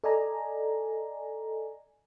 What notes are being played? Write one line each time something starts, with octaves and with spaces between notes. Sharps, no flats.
A4 D5 D#5 G#5 A#5